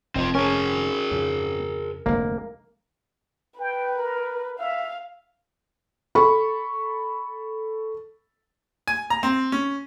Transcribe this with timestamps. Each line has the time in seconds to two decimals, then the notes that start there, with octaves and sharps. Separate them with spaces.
0.15 F1 C4 F4
0.35 C#4 G#4 A#4
1.11 F2 C#3
2.06 F1 D2 G#3 A#3
3.60 B4 G5
3.96 A#4
4.59 E5 F5
6.15 A4 B5 C#6
8.87 G#5
9.10 A#5
9.23 C4
9.52 C#4